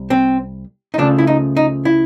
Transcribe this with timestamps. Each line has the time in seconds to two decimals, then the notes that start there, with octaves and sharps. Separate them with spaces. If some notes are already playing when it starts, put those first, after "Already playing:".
Already playing: C2
0.10 C4
0.94 D#4
0.98 C#2 C#3 F3 A3 D4
1.18 E4
1.27 D#4
1.57 D#4
1.85 E4